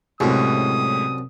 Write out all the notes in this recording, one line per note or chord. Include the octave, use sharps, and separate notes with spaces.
C2 F#2 A2 G#3 D#6